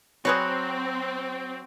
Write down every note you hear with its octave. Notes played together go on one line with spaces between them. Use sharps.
F#3 C4 G#4 B4 C#5